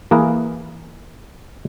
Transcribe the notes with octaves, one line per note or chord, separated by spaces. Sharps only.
E3 A#3 G#4 A#4 B4